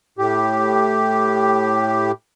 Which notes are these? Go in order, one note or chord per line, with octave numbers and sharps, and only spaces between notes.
A2 G4